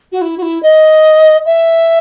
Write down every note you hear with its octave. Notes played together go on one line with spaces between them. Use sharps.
F#4
E4
F#4
E4
D#5
E5